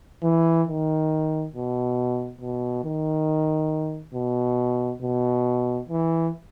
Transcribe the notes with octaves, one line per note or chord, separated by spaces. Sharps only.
E3
D#3
B2
B2
D#3
B2
B2
E3